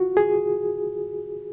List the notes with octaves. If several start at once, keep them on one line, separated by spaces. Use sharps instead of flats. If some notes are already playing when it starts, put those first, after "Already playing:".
Already playing: F4 F#4
G#4